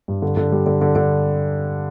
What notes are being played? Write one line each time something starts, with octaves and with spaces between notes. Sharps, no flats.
G2
D3
D3
G3
D3
D3
D3